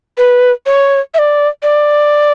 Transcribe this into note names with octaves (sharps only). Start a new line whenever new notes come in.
B4
C#5
E5
D5
D5